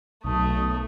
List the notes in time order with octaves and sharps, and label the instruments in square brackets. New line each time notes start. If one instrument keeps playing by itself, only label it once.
[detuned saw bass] B1 [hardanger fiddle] A3 [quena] D#6